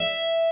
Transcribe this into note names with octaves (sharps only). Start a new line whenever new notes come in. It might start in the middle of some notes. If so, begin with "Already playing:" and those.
Already playing: E5